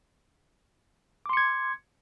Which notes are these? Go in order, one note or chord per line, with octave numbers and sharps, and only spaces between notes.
C6 D6 G#6 C#7